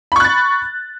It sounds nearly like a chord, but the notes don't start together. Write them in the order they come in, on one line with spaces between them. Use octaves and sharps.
B5 C#6 F#6 A6